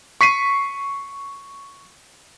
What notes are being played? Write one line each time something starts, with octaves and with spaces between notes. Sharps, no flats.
C#6 B6 C7 D#7